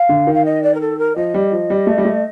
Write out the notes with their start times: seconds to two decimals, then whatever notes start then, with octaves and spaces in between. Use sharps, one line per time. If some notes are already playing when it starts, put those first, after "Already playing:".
Already playing: F5
0.09 D3
0.27 D#3
0.34 F5
0.45 D#5
0.63 D5
0.74 A#4
0.81 A4
0.98 A#4
1.16 F3 D#5
1.34 G3
1.52 F3
1.70 G3
1.87 A3
1.98 G3
2.05 A3